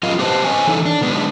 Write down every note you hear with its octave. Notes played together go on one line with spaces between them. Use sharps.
F#3 F4 A#4 D#5 F5
B3 G4 B4 C5 D#5 A5
B4 C#5 D#5 G#5
E3 D#4 E4 A4 C#5
D4
D3 G#3 B3 D4 D#4